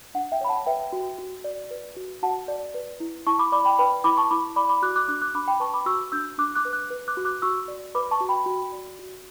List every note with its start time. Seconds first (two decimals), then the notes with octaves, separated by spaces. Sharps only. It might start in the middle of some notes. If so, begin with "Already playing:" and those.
0.14 D4 F#5
0.32 E5 G5
0.41 C#5 B5
0.49 F#5 A5
0.66 B4 E5 G5
0.93 F#4
1.18 F#4
1.44 D5
1.71 B4
1.96 F#4
2.23 F#4 F#5 A5
2.48 D5
2.74 B4
3.00 E4
3.27 E4 A5 C#6
3.39 B5 D6
3.52 D5 B5 D6
3.65 G5 B5
3.79 B4 G5 B5
4.04 E4 B5 D6
4.17 A5 C#6
4.31 E4 B5 D6
4.56 D5 B5 D6
4.69 B5 D6
4.82 F#4 D6 F#6
4.96 D6 F#6
5.08 D4 D6 F#6
5.22 D6 F#6
5.34 D4 B5 D6
5.48 G5 B5
5.60 B4 A5 C#6
5.74 B5 D6
5.86 F#4 C#6 E6
6.12 D4 E6 G6
6.38 D4 D6 F#6
6.55 D6 F#6
6.65 B4
6.73 D6 F#6
6.90 B4
7.08 D6 F#6
7.17 F#4
7.25 D6 F#6
7.42 F#4 C#6 E6
7.68 D5
7.95 B4 B5 D6
8.11 A5 C#6
8.20 F#4
8.29 G5 B5
8.46 F#4
8.72 D5
8.99 F#4